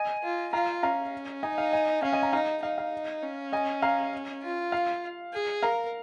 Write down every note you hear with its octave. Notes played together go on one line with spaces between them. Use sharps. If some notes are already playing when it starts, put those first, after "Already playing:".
Already playing: D#5 G#5
F4
F4 F5 A#5
C#4 F5 A#5
D#4 D#5 G#5
F5
D#5 G#5
C#4 F5
D#5 G#5
F5 A#5
D#4 F5 A#5
D#4 F5
F5
C#4
D#5 G#5
F5 A#5
F4
F5
G#4
A#4 F5 A#5